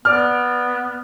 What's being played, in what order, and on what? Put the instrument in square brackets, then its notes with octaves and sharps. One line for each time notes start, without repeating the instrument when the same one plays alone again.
[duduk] B3 [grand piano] D5 D6 F6